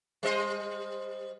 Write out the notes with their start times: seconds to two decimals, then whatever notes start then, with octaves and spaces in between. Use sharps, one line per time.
0.23 G3 C5 D#5